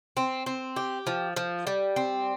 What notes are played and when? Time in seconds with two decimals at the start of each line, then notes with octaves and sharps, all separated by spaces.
0.17 C4
0.46 C4
0.76 G4
1.07 F3
1.36 F3
1.67 G3
1.96 C4